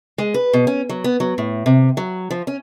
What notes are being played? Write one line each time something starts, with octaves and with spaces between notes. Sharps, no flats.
G#3
B4
B2
C#4
F#3
B3
F#3
A2
C3
F#3
F3
C#4